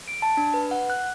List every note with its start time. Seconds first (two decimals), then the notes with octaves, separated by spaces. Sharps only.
0.08 D7
0.22 A5
0.37 D4
0.54 B4
0.71 F#5
0.90 F#6